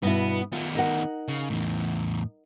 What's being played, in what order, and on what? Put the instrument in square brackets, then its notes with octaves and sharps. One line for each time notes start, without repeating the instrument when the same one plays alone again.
[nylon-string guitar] G2 B2 E4 [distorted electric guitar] B3
[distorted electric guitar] D#3 B3 [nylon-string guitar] F4
[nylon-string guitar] D#4 A#4 F#5
[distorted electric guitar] C#3
E2 A2